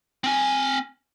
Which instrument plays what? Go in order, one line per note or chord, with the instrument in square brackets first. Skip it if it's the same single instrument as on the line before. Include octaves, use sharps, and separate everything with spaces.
[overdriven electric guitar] C4 G#5